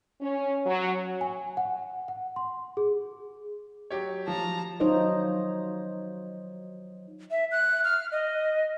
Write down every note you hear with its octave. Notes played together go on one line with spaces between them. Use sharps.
C#4
F#3
G#5
F#5
F#5
C6
G#4
F#3 G4 C#5
F3 A5 A#5
F#3 D#4 F4 C5 C#5 D#5
E5
F#6
F6
D#5